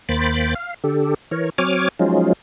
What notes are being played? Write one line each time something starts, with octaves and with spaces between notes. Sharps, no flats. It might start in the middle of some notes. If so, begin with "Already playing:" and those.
D#2 A#3 C5 G5 B5 A6
F5
D3 G4 A4
E3 A#4 C#5
F#3 C4 C#5 G#5 D6 F6
F3 F#3 G#3 C#4 D#4 F4